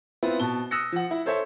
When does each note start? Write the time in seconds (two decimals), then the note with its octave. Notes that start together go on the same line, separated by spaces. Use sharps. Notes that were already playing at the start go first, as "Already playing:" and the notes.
0.23 B3 C4 E4 F4
0.40 B2 A5 G7
0.71 D#6 E6 F#6 A#6 C#7
0.92 F3 F#5
1.11 E4
1.26 A4 C5 C#5 E5